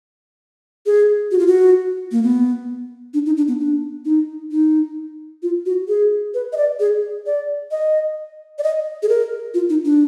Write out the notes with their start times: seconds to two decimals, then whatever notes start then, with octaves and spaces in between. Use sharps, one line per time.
0.86 G#4
1.32 F#4
1.39 F4
1.47 F#4
2.12 A#3
2.23 B3
3.14 D4
3.26 D#4
3.37 D4
3.48 B3
3.60 D4
4.05 D#4
4.51 D#4
5.43 F4
5.66 F#4
5.88 G#4
6.34 B4
6.53 D#5
6.57 D5
6.80 G#4
7.26 D5
7.71 D#5
8.59 D5
8.63 D#5
9.03 G#4
9.09 A#4
9.54 F4
9.70 D#4
9.85 D4